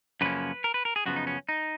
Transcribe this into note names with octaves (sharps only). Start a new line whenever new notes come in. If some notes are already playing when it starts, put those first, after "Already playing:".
F#2 C#3 F3 A#3 C#4 B4
A#4
B4
A#4
G#4
F#2 C#3 F3 B3 F#4
D#4
C#4
D#4